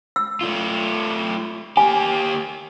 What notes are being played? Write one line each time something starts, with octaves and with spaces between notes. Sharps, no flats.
E6
A3 F4
A#3 G4 G#5